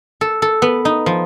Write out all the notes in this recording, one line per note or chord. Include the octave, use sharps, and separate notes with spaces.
A4
A4
B3
D#4
F3